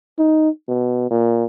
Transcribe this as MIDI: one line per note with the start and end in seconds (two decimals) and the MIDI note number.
0.18 0.49 63
0.68 1.08 47
1.11 1.44 46